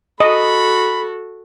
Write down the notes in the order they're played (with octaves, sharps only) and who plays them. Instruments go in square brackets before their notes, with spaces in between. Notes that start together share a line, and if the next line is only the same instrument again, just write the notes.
[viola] F#4 A4 [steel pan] D#5 [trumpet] B5